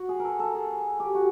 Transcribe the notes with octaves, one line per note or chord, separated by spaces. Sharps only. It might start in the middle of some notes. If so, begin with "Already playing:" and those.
Already playing: F#4
G#4
A4 A#4
A4
G#4
G4
F#4